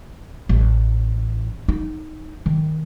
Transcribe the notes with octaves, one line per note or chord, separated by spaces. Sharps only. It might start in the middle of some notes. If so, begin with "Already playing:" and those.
A1
D#4
D#3